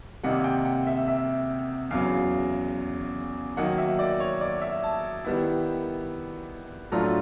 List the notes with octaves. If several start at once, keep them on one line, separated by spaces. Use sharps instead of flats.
C3 D#3 G3 A#3 D#4 F#5
G5
F#5
E5
E5
E2 C#3 F#3 F5
D#3 F#3 A#3 D#4 F#5
E5
D5
C#5
D5
E5
A5
D#3 G3 B3 E4
A2 F#3 A3 D4 F4 A#5